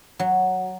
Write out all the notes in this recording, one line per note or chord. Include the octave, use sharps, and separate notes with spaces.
F#3